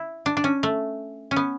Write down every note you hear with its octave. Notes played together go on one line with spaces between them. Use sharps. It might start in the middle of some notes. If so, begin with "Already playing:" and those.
Already playing: E4
D4
D4
C#4
A3
C#4
B3